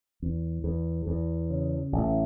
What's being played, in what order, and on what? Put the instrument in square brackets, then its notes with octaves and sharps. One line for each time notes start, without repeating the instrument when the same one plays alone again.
[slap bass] E2
E2
E2
C#3
A1